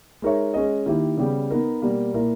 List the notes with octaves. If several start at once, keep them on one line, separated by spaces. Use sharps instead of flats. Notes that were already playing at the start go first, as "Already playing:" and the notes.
G#3 D#4 A#4 C#5 E5
G#3 C#4 G#4 D#5
D#3 A#3 E4 G4
C#3 G3 B3 G4
B3 D#4 A#4
B2 G3 A#3
A#2 A#3 E4 A#4